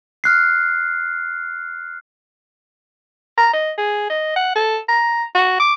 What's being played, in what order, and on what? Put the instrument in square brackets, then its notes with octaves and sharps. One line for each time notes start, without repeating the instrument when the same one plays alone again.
[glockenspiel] F6 F#6 C7
[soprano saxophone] A#5
D#5
G#4
D#5
F#5
A4
A#5
F#4
D6